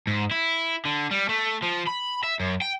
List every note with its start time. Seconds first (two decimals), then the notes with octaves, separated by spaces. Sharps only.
0.07 G#2
0.31 E4
0.85 D3
1.11 G3
1.29 A3
1.62 F3
1.87 B5
2.23 E5
2.40 F#2
2.62 G5